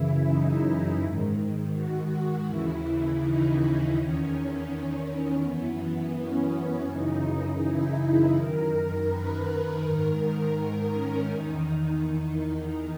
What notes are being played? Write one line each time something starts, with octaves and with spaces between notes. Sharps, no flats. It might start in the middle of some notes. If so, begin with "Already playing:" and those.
Already playing: F#2 C#3 E3 E4
D#4
G#2 D#3
F#4
F#4
D#2 C#3 E3 E4
D#4
E2 D#3 C#4
F#2 E3 B3
B3
C#4
F#2 C#3 E3 D#4
E4
F#2 D#3 A#4
B4
G#2 D#3 A#4
C#4
E2 D#3 D#4
D#4